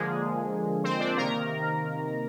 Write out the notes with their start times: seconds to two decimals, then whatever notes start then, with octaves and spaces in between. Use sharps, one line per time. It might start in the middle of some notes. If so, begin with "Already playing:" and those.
Already playing: D3 F3 G#3 A#3 G#4
0.84 C4 C5
1.00 D4 D5
1.16 C3 D#3 A#3 A#4 A#5